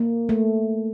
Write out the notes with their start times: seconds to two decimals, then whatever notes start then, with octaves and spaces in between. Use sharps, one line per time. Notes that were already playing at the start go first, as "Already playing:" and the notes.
Already playing: A#3
0.29 A3